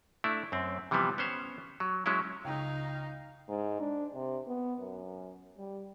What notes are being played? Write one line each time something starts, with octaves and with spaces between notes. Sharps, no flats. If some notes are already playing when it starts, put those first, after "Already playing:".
A3 D4 E4
F#2 C4
C3 E3 F3 G3 B3
B3 C#4 C5 C#5
F#3
F#3 G#3 C#4 E4
C#2 D#4 F5 G5
G#2
D4
C3
B3
F#2
G3